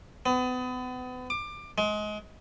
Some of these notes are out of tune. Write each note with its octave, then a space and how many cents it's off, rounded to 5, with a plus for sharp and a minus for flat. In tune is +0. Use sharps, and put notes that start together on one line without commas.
B3 +35
D6 +25
G#3 +25